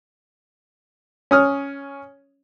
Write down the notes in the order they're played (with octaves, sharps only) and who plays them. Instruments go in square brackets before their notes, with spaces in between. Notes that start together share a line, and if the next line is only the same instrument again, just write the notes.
[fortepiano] C#4 D#6 F6